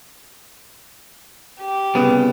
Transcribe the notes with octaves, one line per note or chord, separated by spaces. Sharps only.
G4
C2 C#3 B3